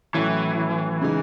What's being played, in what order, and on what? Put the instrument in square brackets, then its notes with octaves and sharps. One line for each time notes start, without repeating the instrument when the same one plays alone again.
[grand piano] A2 F#3 C#4 [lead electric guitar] E3
[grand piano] C#3 G#3 D#4